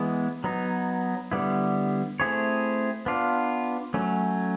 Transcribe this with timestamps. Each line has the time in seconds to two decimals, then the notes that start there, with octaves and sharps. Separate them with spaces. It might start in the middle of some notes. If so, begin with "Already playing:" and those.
Already playing: E3 G#3 B3
0.44 F#3 B3 D#4
1.31 D3 G3 B3 E4
2.20 A3 C4 E4 G#4 C#5
3.06 B3 D4 F4
3.94 F#3 A3 C#4